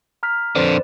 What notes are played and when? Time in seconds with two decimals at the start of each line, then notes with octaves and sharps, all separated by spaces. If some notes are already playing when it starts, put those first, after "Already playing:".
0.23 A#5 F6 B6
0.56 F2 D3 B4 C5 D5